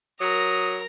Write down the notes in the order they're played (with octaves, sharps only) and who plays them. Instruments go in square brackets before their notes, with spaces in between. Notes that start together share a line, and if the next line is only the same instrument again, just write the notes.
[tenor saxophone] F#3 [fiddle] A#4 A#5 [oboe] D#6